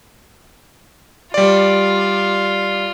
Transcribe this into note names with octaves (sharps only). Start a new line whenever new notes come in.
G3 F4 D5